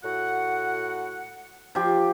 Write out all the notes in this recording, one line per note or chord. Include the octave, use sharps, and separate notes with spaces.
A2 F#4 F#5
F3 G4